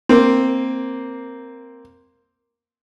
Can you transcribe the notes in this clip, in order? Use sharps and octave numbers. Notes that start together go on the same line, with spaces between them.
A#3 C4